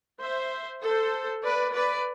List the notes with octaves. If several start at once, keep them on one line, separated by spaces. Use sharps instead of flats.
C5 E5
A4 C5
B4 D5
B4 D5